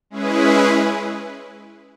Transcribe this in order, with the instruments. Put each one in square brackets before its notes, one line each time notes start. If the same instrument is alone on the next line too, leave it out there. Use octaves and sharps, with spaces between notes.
[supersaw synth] G#3 C#4 E4 G#4 B4